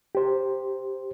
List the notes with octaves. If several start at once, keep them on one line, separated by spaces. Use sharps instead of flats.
G4 C5